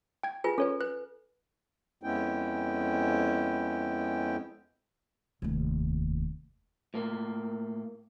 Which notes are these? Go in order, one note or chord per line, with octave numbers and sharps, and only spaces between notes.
G5 G#6
F4 G#4 A4 B4 G#5
C#4 A4 B4 C#5
B4 F#6
F2 G#3 B3 C#4 E4 G5
F1 D#2
A2 A#3